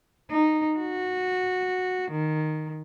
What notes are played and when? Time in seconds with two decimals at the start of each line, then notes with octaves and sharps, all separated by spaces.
0.30 D#4
0.77 F#4
2.11 D#3